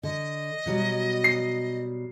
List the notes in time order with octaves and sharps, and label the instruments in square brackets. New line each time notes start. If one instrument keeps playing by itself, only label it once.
[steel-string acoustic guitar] D3 [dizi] D#5
[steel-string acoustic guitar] B2 F#3 G3
[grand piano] C7